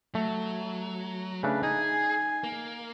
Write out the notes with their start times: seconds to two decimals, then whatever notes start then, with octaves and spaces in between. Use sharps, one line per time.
0.15 F#3 A3
1.43 C#3 A3 D4 B4
1.63 D#4 G#4 G#5
2.44 A#3